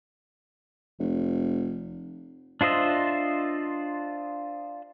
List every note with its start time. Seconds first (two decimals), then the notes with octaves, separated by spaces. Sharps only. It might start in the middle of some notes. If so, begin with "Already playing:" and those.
0.99 F1
2.61 D4 F4 C5 D#5 E5